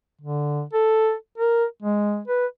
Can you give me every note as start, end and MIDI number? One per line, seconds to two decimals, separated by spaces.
0.21 0.62 50
0.73 1.14 69
1.38 1.65 70
1.82 2.21 56
2.28 2.46 71